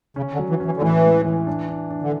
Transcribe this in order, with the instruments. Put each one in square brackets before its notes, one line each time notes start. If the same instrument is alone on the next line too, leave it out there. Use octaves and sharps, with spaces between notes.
[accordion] C#3 [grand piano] C#4
[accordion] D3
[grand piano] F#3
[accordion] E3
[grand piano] C#4
[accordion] E3
D3
[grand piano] A2 [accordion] E3
[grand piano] G#3
E3
D4
D4
D4
[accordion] D3